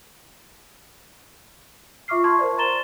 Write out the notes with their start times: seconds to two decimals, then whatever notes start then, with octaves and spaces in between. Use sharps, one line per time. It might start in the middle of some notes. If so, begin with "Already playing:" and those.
2.08 F4 E5 C#6 D6 F6 C7
2.24 A5 C6 C#6 G#6
2.39 A#4 C5 D5
2.58 A#5 C6 A6 E7 G7